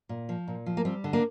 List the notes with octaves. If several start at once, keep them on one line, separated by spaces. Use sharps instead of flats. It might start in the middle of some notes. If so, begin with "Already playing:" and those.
A#2
F3
A#2
F3
A#3
G3 C4
D3
A#3 D4